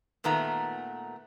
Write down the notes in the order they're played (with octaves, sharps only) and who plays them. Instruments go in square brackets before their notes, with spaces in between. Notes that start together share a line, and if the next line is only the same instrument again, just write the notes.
[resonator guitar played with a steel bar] A#2 D#3 A3 B3 A#5